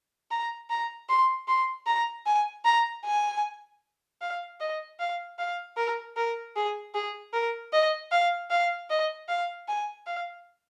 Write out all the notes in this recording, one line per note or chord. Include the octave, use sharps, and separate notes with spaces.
A#5
A#5
C6
C6
A#5
G#5
A#5
G#5
F5
D#5
F5
F5
A#4
A#4
G#4
G#4
A#4
D#5
F5
F5
D#5
F5
G#5
F5